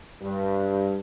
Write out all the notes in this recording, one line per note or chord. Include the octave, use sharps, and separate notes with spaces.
G2